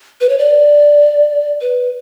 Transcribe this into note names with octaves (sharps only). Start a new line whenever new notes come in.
B4
C#5
D5
B4